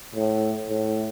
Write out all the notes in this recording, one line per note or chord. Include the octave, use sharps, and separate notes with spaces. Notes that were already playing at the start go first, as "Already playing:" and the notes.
A2
A2